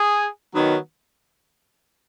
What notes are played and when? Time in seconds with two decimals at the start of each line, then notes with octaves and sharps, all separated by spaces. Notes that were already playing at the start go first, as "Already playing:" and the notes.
Already playing: G#4
0.53 D#3 F#3 B3